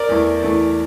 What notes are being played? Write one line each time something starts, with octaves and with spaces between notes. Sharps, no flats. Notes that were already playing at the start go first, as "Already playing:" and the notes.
Already playing: A#4 D5
E2 E3 A3 E4
E2 E3 A3 E4